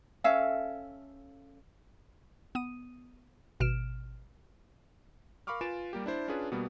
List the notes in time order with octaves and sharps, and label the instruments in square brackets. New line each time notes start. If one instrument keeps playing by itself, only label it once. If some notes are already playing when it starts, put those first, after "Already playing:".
[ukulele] C#4 A4 E5 F5
[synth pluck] B3 D#6 D#7
G#1 B2 F6 D7 E7
[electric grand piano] A#4 F5 B5 C#6 D6 F6
F4 B4 G#5 A6 D7 E7
G3 A#3 G4
D4 E4 C5
C#4 D4 F4 G#4 B4
B2 G3 A#3 B3